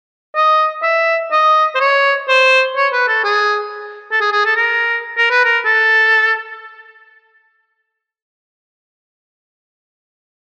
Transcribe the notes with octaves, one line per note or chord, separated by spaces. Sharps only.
D#5
E5
D#5
C5
C#5
C5
C#5
B4
A4
G#4
A4
G#4
G#4
A4
A#4
A#4
B4
A#4
A4